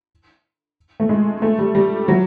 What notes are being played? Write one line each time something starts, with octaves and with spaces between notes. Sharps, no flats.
A3
G#3
A3
G3
G3
F#3